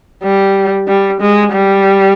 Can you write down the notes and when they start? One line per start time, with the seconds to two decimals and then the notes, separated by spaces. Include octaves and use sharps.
0.23 G3
0.88 G3
1.21 G#3
1.52 G3